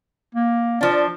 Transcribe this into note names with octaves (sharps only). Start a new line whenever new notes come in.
A#3
F3 D4 D5